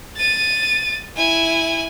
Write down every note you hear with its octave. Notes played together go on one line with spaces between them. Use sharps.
A6 D#7
E4 G#5